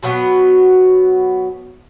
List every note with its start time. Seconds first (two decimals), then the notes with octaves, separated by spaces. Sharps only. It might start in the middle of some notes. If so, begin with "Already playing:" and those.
0.03 B2 F#3 B3